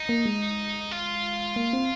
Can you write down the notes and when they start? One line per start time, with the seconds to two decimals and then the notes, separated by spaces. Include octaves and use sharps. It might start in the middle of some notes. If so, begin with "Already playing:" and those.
Already playing: D#4
0.09 A#3
0.26 G#3
0.91 F4
1.56 A#3
1.73 C4